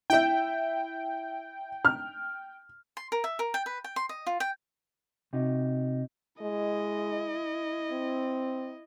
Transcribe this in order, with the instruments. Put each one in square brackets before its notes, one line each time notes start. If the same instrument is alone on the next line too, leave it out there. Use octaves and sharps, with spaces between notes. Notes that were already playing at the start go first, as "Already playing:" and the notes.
[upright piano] E4 E5 [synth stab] G5
[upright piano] F6
[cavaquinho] C6
A#4
E5
A#4
G5
B4
G5
C6
D#5
F4
G5
[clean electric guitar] C3 D#4 F#4
[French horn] G#3 [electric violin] E4 D#5
[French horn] C4